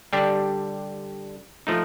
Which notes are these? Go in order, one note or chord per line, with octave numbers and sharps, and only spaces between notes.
D3 G3 D4 G4
F3 A3 D#4